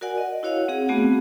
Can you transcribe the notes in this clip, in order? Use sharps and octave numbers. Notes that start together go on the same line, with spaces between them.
F#4 A#4 D5 F#5 G#5
D#5
E4 F#4 C#5 F5 F#5
C4 G#4 F#5
A3 B3 C4 F#4 G#4